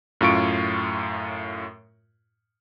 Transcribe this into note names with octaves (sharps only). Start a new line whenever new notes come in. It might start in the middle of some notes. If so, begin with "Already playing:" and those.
F#2 A2 F4 C#6 D7